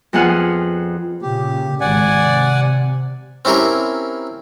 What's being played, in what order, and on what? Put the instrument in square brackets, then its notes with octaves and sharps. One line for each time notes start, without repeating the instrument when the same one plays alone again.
[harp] F2 B3 G#4 F#5 F6
[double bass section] A#2 C#3 [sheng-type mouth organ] G4
[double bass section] G#1 [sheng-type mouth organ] D5 F#5 G#5
[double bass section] C3
[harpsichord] C4 C#4 E4 G4 A#4